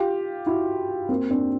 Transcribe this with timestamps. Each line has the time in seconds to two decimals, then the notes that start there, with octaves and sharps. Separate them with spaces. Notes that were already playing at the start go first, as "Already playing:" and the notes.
Already playing: F4 G4
0.47 E4 F#4
1.09 A#3 C4
1.31 C4 D4